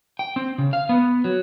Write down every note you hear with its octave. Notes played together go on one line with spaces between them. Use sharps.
G5
C4
C#3
F5
B3
F#3